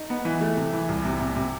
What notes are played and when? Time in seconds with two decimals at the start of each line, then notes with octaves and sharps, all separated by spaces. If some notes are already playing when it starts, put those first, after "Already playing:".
Already playing: D#4
0.10 B3
0.25 E3
0.41 A3
0.57 C3
0.73 E3
0.89 C2
1.05 C3
1.21 C3
1.36 C3